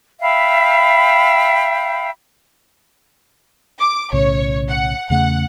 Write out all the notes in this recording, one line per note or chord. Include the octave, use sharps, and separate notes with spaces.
E5 F5 G5 B5
D6
B1 A2 C#3 C#5
F#5
E2 C#3 A3 F#5